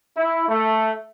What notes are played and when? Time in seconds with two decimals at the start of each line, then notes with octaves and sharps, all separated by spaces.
0.17 E4
0.48 A3